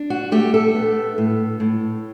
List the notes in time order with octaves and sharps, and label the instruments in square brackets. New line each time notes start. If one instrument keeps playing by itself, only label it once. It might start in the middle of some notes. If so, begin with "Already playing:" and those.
Already playing: [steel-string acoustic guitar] D4
F#4
A3 G4
A4
B3
A2
A2